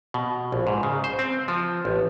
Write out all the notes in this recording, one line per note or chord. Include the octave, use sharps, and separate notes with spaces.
B2
A#1
G#2
C#3
C5
C4
F3
A1